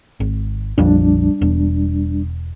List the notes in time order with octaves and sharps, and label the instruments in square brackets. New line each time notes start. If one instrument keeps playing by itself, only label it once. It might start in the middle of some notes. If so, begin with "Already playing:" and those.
[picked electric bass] G#1
[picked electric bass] A#1 F2 [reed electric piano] G3 D4
[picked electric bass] E1